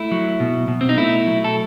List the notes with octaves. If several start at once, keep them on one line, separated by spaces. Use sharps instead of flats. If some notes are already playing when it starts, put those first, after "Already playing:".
Already playing: A3 E4
F#3
B2
B2
C4
D#4
A3 E4
F#3
A4